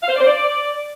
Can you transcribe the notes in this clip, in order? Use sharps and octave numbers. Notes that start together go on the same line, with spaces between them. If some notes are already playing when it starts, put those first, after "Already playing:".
F5
C5
D5
C5
D5